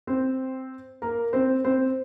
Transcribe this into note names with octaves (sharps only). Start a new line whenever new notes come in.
C4 C5
A#3 A#4
C4 C5
C4 C5